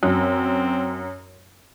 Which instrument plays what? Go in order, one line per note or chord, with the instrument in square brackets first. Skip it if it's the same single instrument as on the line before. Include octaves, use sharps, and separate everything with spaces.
[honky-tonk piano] F#2 [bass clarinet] C4